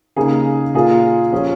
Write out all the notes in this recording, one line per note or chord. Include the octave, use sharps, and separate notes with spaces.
C#3 A#3 D#4 G#4
A#2 A#3 F4 G#4
F3 C#4 G#4